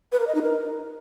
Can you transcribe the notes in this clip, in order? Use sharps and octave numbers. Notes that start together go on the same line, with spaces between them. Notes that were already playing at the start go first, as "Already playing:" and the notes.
B4
A#4
D#5
D#4
A#4